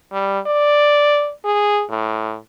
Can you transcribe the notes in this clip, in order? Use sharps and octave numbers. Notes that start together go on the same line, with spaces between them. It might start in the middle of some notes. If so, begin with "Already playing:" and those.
G3
D5
G#4
A2